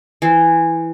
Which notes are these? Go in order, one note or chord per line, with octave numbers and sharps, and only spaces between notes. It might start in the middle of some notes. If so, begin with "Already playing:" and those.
E3 C5